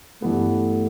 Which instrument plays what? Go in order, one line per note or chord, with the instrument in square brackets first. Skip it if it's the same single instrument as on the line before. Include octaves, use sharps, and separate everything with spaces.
[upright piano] G2 E3 B3 [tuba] A3